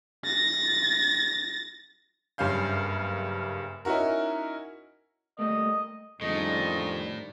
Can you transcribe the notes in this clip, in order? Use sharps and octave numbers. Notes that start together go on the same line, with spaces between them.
A6 A#6
F#1 G2 C#4 F5 G6
C#4 D#4 E4 F#4 A#4
G3 A3 A#3 D#5
F2 A2 D#3 G3 G#3 C#4 D4 D#5